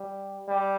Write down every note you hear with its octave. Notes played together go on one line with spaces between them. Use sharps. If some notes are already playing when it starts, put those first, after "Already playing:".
Already playing: G3
G3